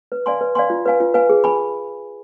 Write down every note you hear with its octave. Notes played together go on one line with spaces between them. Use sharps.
B4
D5 F5 G#5 C6
B4
D5 F5 G#5 C6
F4
B4 F5 G#5
F4
B4 F5 G#5
G#4
G#5 B5